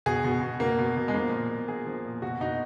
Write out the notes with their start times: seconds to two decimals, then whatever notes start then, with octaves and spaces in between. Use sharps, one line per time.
0.06 B2 G#4
0.24 B2
0.42 B2
0.60 B2 A#3
0.79 B2
0.97 B2
1.08 G#3
1.14 F3 A#3
1.32 A#2
1.50 A#2
1.68 F3 G#4
1.87 F3
2.05 A#2
2.22 B2 F#4
2.40 B2 D#4